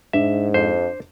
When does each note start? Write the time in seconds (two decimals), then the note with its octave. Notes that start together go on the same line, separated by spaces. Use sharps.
0.13 G#2 D4 E5
0.54 F2 C5